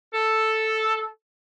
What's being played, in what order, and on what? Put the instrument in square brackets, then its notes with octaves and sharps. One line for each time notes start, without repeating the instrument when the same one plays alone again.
[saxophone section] A4